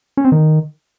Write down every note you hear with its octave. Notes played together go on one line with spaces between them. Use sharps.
C#4
C4
D#3